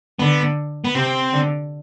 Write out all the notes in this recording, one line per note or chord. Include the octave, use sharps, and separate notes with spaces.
D3 B3
B3
C3 C4
D3